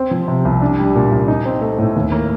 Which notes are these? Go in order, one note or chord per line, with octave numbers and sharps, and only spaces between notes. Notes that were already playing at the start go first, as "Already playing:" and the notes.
Already playing: C4
F3
C3
C2
D4
G3
A#2
C2
D#4
C4
A3
A2
D#2
A#3